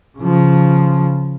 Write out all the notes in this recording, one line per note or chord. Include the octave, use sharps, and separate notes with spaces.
C#3 F3